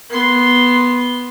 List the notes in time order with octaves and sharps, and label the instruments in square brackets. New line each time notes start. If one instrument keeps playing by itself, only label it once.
[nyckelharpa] B3 C6